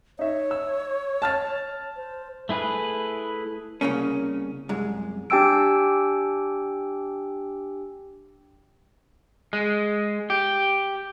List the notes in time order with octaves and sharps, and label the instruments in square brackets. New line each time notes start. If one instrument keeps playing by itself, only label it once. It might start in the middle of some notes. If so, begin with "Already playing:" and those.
[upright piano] D#4 E5 [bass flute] C#5
[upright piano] E6
A5 F6 A6
[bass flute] C5
[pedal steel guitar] A3 E4 G#4 B4
[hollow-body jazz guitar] C2 C#3 A#3 C#4
C2 F#2 G#3
[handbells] D4 G4 G5 G#5 E6 D7
[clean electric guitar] G#3
G4